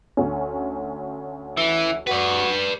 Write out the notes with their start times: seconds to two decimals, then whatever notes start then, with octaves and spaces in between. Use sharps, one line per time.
0.17 D2 C#4
1.57 E3 E5
2.07 F#4 B4 D5